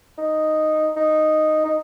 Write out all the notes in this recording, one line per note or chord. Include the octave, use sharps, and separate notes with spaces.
D#4
D#4
D#4